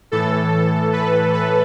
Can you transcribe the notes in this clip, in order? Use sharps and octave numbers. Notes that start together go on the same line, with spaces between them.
A2 E3 A4
B4
B4